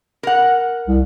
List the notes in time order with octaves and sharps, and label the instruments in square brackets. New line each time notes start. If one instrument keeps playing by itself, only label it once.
[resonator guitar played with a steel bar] A#4 F#5
[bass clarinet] C2